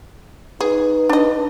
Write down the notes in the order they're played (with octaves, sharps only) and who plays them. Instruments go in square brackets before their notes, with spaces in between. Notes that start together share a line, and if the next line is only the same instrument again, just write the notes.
[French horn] D#4 [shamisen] G#4 [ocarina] B4
[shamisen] D4 D#5